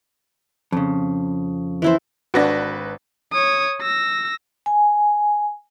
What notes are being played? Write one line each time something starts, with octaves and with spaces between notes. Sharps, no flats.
F2 C#3
E3 E4 C5
G#1 D4 F#4 B4 A#6
C#5 D#6
E6 A#6
G#5